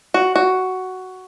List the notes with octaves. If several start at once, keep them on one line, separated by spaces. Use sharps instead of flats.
F#4
F#4